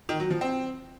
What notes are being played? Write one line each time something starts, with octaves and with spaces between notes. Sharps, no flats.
D#3
F#3
F3
C4